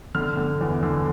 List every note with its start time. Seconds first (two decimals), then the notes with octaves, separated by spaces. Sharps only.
0.15 D3 F6
0.37 D3
0.61 E2
0.83 D3